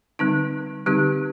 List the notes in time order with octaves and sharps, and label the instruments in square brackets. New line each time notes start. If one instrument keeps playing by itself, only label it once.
[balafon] D3 G3 C4 D#4
D3 G3 C4 D#4 G4